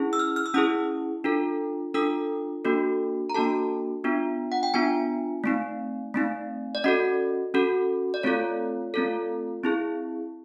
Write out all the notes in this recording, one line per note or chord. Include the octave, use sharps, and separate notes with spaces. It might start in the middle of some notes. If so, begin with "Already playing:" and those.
Already playing: C#4 E4 G#4
E6
F6
F6
E6
C#4 E4 G#4 D#6
D4 F4 A4
D4 F4 A4 D#6
A#3 D4 F#4 A4
A#5
A#3 D4 F#4 A4 A5
B3 D4 F4
F#5
G5
B3 D4 F4 G#5
A3 C4 D#4
A3 C4 D#4
D5
C#4 F#4 A4 D#5
C#4 F#4 A4
D5
A3 C4 F4 A4 C#5
A3 C4 F4 A4
C4 E4 G#4